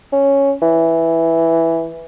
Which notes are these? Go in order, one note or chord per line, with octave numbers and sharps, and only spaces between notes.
C#4
E3